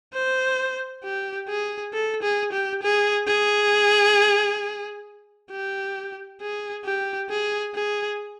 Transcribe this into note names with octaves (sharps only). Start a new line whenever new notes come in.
C5
G4
G#4
A4
G#4
G4
G#4
G#4
G4
G#4
G4
G#4
G#4